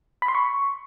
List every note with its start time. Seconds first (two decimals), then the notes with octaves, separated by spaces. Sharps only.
0.22 B5
0.28 C6
0.35 C#6